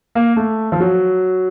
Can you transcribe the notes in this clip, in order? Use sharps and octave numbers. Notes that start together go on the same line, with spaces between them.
A#3
A3
F3
F#3